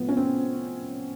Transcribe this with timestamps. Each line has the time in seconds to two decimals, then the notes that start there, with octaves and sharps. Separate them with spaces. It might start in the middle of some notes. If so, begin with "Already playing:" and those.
Already playing: A2 F3 B3
0.09 C#4
0.17 C4